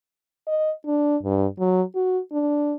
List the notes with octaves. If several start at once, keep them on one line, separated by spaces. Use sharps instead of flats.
D#5
D4
G2
F#3
F#4
D4